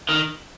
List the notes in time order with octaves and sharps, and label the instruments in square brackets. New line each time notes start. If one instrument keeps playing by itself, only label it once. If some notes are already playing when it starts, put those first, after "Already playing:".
[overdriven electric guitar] D#3